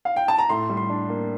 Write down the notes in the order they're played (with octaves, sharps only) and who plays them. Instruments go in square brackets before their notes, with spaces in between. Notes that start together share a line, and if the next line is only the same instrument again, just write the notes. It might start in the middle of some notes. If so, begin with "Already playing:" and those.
[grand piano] F5
G5
A5
A#5
A2 C6
G3
C6
D4
A#3